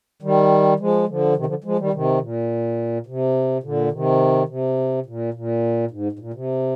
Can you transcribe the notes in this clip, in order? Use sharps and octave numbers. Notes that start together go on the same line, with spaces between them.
D#3 G3
F3 G#3
D3 F3
C3 D#3
D3 F3
F3 G#3
D#3 G3
C3 D#3
A#2
C3
A#2 D3
C3 D#3
C3
A#2
A#2
G#2
G#2
A#2
C3